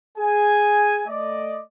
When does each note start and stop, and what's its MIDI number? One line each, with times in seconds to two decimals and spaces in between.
0.18 1.02 68
0.18 1.02 80
1.08 1.60 57
1.08 1.60 74
1.08 1.60 75